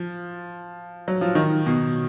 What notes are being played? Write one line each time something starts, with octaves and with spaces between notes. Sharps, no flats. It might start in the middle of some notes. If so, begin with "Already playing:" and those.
Already playing: F3
F#3
F3
D#3
B2